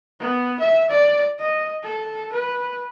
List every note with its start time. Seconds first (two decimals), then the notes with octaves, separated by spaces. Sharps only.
0.20 B3
0.60 E5
0.90 D5
1.39 D#5
1.83 A4
2.32 B4